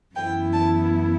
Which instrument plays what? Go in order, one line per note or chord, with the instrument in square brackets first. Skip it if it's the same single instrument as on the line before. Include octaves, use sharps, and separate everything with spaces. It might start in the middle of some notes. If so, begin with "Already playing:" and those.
[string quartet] F#2 E3 B3 E4 G5
A5